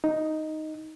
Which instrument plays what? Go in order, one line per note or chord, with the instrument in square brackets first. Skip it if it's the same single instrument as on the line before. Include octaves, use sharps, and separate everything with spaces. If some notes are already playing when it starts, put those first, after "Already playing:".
[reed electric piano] D#4